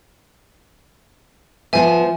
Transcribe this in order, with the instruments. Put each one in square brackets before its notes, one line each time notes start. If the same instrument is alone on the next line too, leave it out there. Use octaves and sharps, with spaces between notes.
[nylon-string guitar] F3 B3 [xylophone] E5 G#5